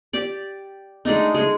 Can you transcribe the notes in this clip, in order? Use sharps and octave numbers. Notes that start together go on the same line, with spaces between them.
G4 D5
G#3 A3 D4 D#4
G#3 D#4 G#4